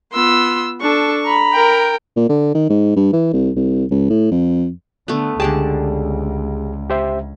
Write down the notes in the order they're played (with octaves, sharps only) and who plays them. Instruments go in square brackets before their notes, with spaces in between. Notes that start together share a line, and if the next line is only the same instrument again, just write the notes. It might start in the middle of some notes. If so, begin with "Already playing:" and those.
[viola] B3 F4 [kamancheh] C6 E6
[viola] D4 A4 [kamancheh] C#6
[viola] A#5 B5
[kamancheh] A#4 G5
[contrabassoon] A#2
D3
D#3
G#2
G2
E3
C2
C2
C#2
A2
F2
[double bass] D3 [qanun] A3 B3
[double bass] C#2 [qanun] D3 D5 A5 [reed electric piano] G4 G#4
[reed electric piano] G4 C5 E5